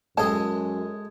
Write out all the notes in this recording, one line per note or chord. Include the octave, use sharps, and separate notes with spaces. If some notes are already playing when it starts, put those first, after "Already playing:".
F#2 G#3 A4 D#5 A5